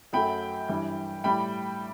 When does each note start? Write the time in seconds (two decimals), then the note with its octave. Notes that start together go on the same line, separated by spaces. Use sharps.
0.13 F#2 F#3 A3 G5 B5
0.69 G2 E3 G3
1.24 A2 G3 G5 B5